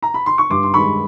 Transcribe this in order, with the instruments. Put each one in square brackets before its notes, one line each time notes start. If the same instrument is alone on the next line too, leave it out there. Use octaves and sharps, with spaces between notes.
[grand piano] A#5
B5
C6
C#6
G2 C6 D6
C6
D#3 G#3 B5 C#6